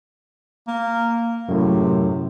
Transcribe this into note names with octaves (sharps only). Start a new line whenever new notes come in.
A#3
F#2 A2 C3